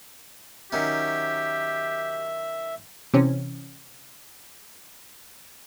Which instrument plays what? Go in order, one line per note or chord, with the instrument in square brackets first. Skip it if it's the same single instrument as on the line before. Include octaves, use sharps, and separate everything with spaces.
[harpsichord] D#3 F#3 C#4 [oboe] G4 [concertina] E5
[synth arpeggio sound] C3 E3 C4 C#4